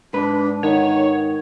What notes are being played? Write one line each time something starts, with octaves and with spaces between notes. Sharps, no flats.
G#2 D4 B4
D#3 C#5 F#5